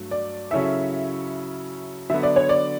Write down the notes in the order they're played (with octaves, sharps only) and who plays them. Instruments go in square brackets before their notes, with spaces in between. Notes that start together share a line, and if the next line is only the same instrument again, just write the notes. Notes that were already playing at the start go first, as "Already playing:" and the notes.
Already playing: [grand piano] G2 F#3 A3
[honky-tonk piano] D5
[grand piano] C#3 F#3 C#4 E4 A4 [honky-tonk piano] E5
[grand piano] D3 F#3 B3 [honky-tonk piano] E5
[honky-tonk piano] D5
C#5
D5